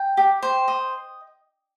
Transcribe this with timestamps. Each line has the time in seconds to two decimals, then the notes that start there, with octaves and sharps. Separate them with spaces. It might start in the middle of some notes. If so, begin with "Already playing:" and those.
Already playing: G5
0.17 G4
0.43 C5
0.68 D#5